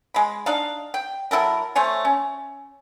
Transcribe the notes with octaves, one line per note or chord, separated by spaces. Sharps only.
G#3 B5
D4 D#4 F5
G5
F#3 E4 A4 A#4
A3 C5 C#5 G#5
C#4